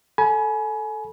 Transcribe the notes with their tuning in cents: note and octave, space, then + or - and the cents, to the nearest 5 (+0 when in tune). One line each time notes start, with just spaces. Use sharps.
A4 +0 G#5 +30 B5 -30